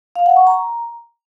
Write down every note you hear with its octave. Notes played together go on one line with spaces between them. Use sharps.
F5
F#5
C#6
A#5